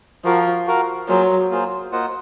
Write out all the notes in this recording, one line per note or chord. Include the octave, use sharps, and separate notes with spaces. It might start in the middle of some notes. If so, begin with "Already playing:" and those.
F3 F#4 A#4 F5
F#4 A#4 F5
F#3 A#3 F4 G#4 C5
A#3 F4 G#4 C5
A#3 F4 C5 D#5 F#5